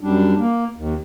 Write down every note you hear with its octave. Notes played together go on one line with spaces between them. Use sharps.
F#2 G3 D4
A#3
D#2